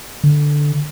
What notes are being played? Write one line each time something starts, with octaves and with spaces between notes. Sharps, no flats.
D3